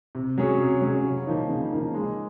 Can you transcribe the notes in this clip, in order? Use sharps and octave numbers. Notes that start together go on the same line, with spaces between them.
C3
F#3 C#4 G#4 C#5
C3
F#3 C#4 G#4 C#5
C#3
F3 A#3 D#4
C#3
F3 A#3 D#4
G#3